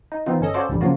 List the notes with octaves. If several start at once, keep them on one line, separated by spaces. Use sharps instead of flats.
D#4
E3 B3 C4 D#4 F4
G1 C#4 A4 D#5
C#4 F4 F#4 A4 C5 D5
G1 C2 A2 D3 E3 G3
C#3 F3 F#3 A#3 F4 F#4